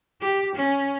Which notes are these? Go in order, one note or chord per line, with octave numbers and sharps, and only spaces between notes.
G4
C#4